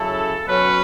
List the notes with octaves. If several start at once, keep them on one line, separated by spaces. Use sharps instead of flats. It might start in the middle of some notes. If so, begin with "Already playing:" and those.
Already playing: C#3 F#3 C#4 E4 A4
B2 F#3 C#4 B4